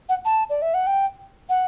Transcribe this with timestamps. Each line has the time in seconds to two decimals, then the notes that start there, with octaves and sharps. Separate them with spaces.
0.09 F#5
0.25 A5
0.50 D5
0.62 E5
0.74 F#5
0.87 G5
1.49 F#5